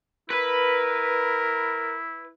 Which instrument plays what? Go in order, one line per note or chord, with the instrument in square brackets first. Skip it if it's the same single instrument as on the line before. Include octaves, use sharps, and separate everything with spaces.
[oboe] E4 [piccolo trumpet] A#4 [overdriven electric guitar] B4